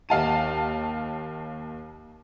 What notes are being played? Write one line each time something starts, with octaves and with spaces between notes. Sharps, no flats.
D#2 F5 A5 D#7